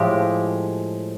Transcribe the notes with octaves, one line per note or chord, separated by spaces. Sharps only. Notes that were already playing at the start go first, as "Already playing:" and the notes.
Already playing: A2 F3 G#3 G4